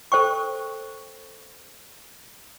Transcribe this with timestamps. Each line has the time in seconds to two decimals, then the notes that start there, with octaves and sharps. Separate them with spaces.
0.12 A4 C5 G5 C#6